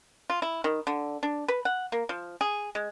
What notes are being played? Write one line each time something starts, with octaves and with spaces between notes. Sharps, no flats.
F4
E4
D#3
D3
D4
B4
F#5
A#3
F3
G#4
G#3